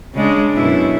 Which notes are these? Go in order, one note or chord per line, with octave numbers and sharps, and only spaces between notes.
C#3 G#3 D4
F#2 B2 E4